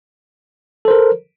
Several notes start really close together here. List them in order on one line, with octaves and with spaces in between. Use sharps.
A4 C5 A#4